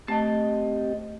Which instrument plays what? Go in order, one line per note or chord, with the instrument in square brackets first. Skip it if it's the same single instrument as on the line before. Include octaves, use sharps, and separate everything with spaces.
[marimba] A3 [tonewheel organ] C4 G4 [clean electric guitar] D#5 A5